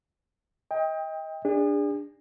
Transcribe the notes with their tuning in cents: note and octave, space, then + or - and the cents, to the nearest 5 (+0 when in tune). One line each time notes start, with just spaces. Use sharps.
D#5 +30 G5 +25
D4 +0 G#4 -35